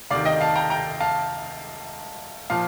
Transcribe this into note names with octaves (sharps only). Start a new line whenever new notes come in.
D2 C3 D#3 D5 F5
D#5 G5
F5 A5
G5 A#5
G5 A#5
F5 A5
A#2 F3 F5 A5